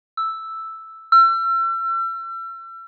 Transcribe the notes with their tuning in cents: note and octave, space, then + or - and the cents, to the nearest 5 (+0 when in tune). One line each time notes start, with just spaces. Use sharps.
E6 +0
E6 +40